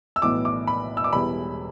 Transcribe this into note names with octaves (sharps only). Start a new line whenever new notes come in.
E6
B1 A2 E3 B3 D6
D6
B5
E6
D6
E1 E2 E3 G3 B5